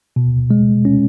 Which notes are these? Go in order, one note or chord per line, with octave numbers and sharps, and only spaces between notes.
B2
G#3
C#4